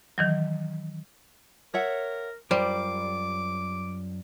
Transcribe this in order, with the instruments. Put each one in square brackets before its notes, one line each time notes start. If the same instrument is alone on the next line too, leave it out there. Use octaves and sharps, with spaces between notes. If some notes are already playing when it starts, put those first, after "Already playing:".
[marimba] D#3 E3 F#3
[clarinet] A#4 [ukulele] C#5 E5 F#5
[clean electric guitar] F#2 F4 A#4 [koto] G3 [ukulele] C5 [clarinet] D6